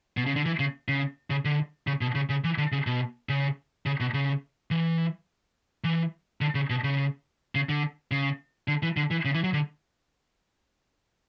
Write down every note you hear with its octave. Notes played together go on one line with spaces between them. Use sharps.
B2
C#3
D3
E3
C#3
C#3
C#3
D3
C#3
B2
C#3
C#3
E3
D3
C#3
B2
C#3
C#3
B2
C#3
E3
E3
D3
C#3
B2
C#3
C#3
D3
C#3
D3
E3
D3
E3
C#3
E3
F#3
D3